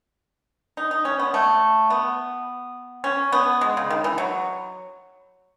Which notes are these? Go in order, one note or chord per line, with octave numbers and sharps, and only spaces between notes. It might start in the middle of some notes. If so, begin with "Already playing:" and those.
D#4
D#4
C#4
B3
A3
B3
C#4
B3
G#3
C#3
D#3
E3
F#3